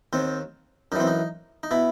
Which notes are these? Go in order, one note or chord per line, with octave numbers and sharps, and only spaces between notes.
D#2 D#3 C4
F#2 E3 C4 D#4
D#4
D#4
B2 E4